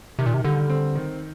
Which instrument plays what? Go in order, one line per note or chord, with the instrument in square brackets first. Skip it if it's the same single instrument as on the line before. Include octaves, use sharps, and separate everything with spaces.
[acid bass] C3 [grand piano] D#3
[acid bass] A#2
C3
[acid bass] D3 [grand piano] G3
[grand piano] C4
D#3